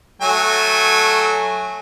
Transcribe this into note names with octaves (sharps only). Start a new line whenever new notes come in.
F#3 A3 G#5